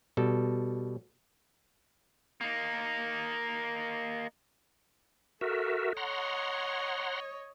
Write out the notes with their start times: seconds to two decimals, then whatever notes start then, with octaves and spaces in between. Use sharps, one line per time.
0.17 B2 G3 A4
2.41 A#3 D#4
5.41 F#4 A4 A#4 E5
5.97 C#5 D#5 F#5 A#5 C6